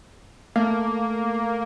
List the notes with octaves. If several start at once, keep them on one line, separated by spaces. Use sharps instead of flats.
A3 A#3